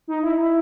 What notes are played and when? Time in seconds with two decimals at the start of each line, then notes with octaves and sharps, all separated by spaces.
0.08 D#4
0.23 E4
0.39 E4